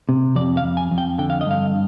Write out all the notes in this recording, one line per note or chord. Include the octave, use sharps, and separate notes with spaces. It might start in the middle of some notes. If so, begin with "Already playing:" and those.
C3
F2 D5
F5
F2
G#5
F2
G5
D3 G5
F5
D#5
G2 F5